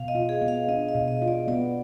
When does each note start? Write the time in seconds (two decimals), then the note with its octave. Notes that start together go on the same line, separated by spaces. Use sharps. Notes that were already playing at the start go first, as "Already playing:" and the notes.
Already playing: B2 F5
0.08 D#5
0.15 F4
0.29 G#4
0.42 B3
0.48 F5
0.68 D4 D#5
0.88 D#5
0.95 B2
1.08 D#5
1.22 F4
1.28 D5
1.48 B3 D5